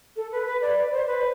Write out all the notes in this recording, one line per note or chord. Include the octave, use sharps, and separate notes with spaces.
A4
B4
B4
D5
D5
C5
B4